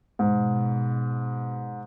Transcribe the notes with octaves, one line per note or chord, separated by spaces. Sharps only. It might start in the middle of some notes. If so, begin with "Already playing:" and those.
G#2 B2